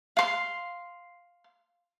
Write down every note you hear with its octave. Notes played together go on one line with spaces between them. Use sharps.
F5 C6